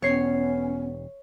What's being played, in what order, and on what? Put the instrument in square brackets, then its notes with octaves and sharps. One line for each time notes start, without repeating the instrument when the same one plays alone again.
[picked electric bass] E1 [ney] B3 [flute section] C#4 [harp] C#5 C7